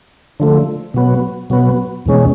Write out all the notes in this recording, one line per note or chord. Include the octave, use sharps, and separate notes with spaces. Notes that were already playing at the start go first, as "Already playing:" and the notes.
D3 F3 A3
B2 F#3 B3
B2 F#3 B3
E2 B2 G#3 C#4